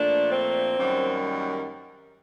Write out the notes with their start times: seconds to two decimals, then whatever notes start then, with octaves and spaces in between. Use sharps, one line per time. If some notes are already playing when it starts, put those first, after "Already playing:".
Already playing: A#2 F3 A3 D4
0.32 C4
0.78 F#2 D#3 G3 A#3